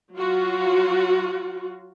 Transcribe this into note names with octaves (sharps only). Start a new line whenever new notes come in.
F#3 F4 F#4